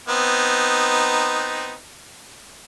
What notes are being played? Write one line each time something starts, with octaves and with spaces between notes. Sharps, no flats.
B3 C4 D#4